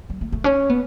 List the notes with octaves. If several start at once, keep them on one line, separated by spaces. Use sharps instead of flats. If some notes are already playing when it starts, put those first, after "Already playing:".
G3
A3
A3
C#4
B3